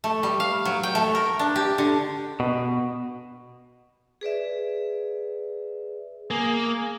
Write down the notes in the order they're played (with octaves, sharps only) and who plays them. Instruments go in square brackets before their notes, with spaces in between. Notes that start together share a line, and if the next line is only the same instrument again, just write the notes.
[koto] A3
G3
F5
F#3
G5
A3
A#4
D4
G4
D3
[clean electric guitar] B2
[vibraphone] G#4 B4 D5 E5
[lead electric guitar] A#3 [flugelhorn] G#4